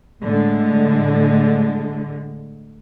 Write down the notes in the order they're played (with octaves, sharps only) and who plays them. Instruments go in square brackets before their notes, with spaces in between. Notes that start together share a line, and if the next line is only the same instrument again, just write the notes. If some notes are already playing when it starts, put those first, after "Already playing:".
[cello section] A2 D3 G#3